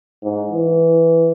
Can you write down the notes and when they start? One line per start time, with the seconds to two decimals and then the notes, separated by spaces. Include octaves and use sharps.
0.23 G#2
0.51 E3